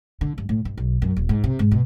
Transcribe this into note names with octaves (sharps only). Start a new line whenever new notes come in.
D3
G2
A2
G2
B1
F#2
D#1
G#2
C3
G#2
B2